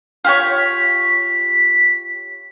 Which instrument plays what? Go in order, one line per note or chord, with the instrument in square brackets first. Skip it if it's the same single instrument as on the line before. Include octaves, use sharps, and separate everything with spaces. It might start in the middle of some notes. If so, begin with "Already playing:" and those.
[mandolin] F4 G4 C#5 [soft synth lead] B6